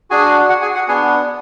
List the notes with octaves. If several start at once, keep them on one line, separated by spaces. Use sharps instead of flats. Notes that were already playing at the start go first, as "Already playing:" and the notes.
D4 F#4 G#4 G#5
F#4 F#5
G#4 G#5
F#4 F#5
B3 D4 F#4 G#4 G#5